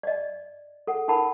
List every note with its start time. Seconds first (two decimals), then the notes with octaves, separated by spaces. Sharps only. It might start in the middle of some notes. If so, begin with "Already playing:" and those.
0.03 D5 D#5
0.87 A4 F#5
1.08 D#4 A#4 F#5 A5 B5